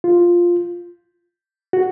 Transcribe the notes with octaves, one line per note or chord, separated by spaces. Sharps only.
F4
F#4